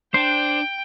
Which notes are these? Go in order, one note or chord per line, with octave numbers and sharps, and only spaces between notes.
D4 C5 G5